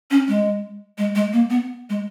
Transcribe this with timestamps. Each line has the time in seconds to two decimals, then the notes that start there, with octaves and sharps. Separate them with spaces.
0.11 C#4
0.28 G#3
0.98 G#3
1.15 G#3
1.33 A#3
1.50 B3
1.90 G#3